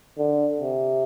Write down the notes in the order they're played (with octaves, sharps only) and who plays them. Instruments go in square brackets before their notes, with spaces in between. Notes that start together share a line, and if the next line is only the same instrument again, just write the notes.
[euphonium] D3
C3